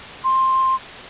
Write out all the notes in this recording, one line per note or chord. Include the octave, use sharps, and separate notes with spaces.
C6